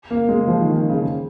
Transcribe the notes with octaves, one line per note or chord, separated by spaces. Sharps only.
A#3
G#3
F3
D#3
D#3
C#3